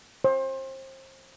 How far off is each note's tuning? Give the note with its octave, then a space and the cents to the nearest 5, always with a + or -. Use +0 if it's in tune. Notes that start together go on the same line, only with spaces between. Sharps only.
C5 +30